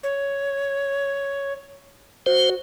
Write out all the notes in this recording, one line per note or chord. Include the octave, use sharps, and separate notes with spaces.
C#5
F#4 C5